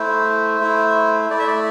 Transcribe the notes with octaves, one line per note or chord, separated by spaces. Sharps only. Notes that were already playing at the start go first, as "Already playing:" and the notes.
Already playing: A3 E4 C5
A3 E4
A3 E4 D5
E5
D5